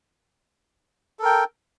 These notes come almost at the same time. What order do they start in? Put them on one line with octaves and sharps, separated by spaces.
A4 A#4 G5